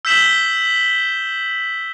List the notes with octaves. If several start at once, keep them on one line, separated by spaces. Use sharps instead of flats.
E6 G6 B6 E7 F#7 G7